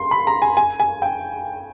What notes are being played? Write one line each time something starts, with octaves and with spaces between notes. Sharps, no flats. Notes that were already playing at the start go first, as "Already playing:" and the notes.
Already playing: C6
B5
A#5
G#5
G#5
G#5
G5